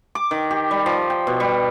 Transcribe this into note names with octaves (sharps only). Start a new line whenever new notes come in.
D6
D#3
G4
G3
F3
G5
B2
G3